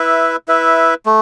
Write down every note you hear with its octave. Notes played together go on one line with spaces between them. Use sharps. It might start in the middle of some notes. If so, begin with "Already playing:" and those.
Already playing: E4 B4 E5
E4 B4 E5
A3